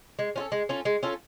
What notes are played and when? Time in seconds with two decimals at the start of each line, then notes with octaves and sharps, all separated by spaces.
0.19 G#3
0.36 C#4 F4
0.40 A4
0.52 G#3
0.69 C#4 F4 A4
0.85 G#3
1.03 C#4 F4 A4